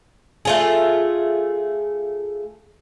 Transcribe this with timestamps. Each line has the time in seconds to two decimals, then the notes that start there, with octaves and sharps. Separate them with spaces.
0.45 A3 F4 G#4